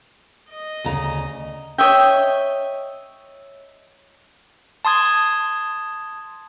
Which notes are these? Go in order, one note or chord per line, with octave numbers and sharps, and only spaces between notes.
D#5
D2 C#3 A#5
C#5 D#5 E5 G5
A5 C6 D#6 G#6